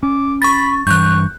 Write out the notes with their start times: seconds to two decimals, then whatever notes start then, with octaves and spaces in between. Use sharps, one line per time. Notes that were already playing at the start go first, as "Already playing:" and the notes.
0.03 C#4 D6
0.42 B5 C#6 A6
0.87 G2 E3 C#6 F#6 G6